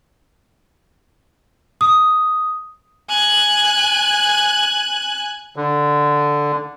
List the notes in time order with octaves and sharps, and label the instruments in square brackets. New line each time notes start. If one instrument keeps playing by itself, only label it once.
[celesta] D#6
[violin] G#5 F#6
[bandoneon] D3